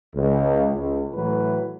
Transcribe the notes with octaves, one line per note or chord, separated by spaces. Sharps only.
C#2
C#2
A2 E3 F#3 B4